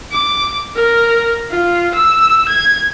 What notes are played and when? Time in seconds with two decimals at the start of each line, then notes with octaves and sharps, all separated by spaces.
0.12 D6
0.76 A#4
1.50 F4
1.94 E6
2.48 G#6